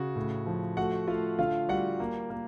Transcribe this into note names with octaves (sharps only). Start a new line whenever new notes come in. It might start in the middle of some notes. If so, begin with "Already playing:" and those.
Already playing: C#3 F#4
A2
F3
A3 F#4 F#5
A3 F4 F5
D3 F4 F5
G3 F#4 F#5
A#3
A#3